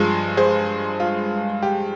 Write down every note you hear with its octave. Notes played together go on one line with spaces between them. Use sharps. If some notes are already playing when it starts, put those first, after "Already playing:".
Already playing: G2 F3 G#3 G#4
G#4 C5
F4
G4